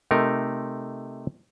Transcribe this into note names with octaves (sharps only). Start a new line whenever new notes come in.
C3 A3 D#4 A#4